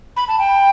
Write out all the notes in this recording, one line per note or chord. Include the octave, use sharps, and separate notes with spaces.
B5
A5
G5